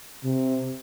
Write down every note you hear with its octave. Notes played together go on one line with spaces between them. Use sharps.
C3